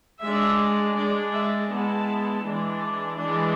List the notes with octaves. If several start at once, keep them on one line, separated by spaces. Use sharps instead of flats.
G#3 D4 E5
G#3 D4 D5
E5
G#3 B3 E4 A5
E3 G#3 D4
E3 G#3 D4